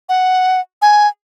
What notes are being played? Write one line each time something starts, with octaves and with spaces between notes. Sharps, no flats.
F#5
G#5